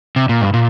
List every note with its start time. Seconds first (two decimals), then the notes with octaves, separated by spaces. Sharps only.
0.16 C3
0.29 A#2
0.41 G2
0.54 A#2